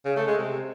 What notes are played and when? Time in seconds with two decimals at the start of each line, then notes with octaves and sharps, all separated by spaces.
0.05 C#3
0.16 A3
0.27 G#3
0.38 C3